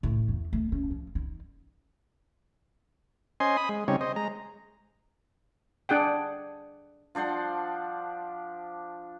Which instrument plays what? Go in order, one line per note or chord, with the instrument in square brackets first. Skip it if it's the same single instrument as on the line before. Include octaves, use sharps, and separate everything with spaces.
[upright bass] A2
E2
A3
C#4
F3
D#4
[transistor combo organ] C#4 C5 D#5 G#5 C6
B5 D#6
G#3
C#3 G3 C4 D#4 C#5
C5 D#5
G#3 A#5
[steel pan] D4 G#4 F#5 G5
[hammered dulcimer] F3 D4 C5 F#5